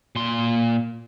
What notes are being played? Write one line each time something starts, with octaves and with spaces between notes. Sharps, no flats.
A#2 C6